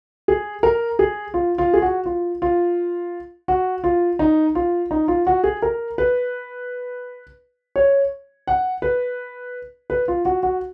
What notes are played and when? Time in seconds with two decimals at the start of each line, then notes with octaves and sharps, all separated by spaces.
0.28 G#4
0.63 A#4
0.99 G#4
1.34 F4
1.58 F4
1.74 G#4
1.82 F#4
2.06 F4
2.42 F4
3.48 F#4
3.84 F4
4.19 D#4
4.55 F4
4.91 D#4
5.08 F4
5.27 F#4
5.44 G#4
5.62 A#4
5.98 B4
7.76 C#5
8.47 F#5
8.82 B4
9.90 B4
10.08 F4
10.25 F#4
10.43 F#4